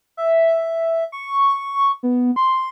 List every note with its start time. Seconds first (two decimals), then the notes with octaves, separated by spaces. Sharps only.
0.17 E5
1.12 C#6
2.03 B3
2.36 C6